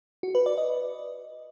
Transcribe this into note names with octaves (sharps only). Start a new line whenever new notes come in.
F#4
B4
D5
D#5